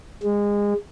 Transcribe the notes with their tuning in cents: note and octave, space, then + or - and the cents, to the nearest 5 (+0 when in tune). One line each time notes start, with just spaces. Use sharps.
G#3 -25